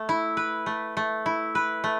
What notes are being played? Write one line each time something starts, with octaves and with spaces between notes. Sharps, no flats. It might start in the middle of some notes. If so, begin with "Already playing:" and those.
Already playing: A3
E4
B4
A3
A3
E4
B4
A3